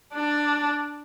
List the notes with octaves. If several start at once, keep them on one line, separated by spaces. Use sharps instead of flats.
D4